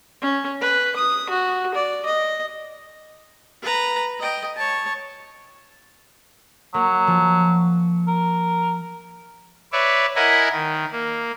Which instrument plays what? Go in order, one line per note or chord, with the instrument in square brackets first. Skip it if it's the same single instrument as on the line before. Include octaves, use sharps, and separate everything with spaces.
[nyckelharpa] C#4
B4
D#6
F#4
D5
D#5
B4 A#5
D#5 G5
C#5 A5
[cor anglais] F#3 [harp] A#3
[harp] F3
[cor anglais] A#4
[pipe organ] B4 C#5 D5 E5
E4 A#4 D#5 F#5 G#5 B5
D#3
A#3